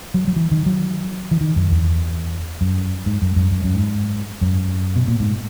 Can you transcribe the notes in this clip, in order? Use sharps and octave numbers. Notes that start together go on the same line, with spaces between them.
F#3
F#3
E3
D#3
F#3
E3
D#3
F#2
E2
F#2
G#2
F#2
F#2
F#2
F#2
G#2
F#2
B2
A#2
G#2